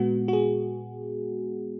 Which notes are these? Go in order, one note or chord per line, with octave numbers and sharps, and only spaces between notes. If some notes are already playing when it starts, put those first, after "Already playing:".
Already playing: A#2 G#3 B3 F#4
F#4
G#4